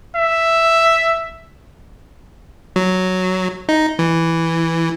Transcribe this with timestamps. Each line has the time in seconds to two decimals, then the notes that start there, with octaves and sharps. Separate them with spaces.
0.15 E5
2.76 F#3
3.69 D#4
3.99 E3